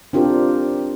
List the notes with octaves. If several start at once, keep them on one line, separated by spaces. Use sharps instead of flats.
C4 D4 F4 G4 A#4